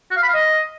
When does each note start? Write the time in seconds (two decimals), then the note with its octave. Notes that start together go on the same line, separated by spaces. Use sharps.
0.11 F#4
0.17 F5
0.22 B5
0.28 F5
0.34 D#5